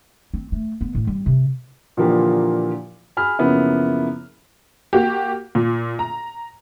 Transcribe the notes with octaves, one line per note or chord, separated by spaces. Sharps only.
C4
A3
B3
A2
G3
C3
A#2 D3 E3 F3 A#3 G4
G#4 B5 F6
F#2 C#3 F3 A#3 B3 E4
A#3 F#4 G4
A#2
A#5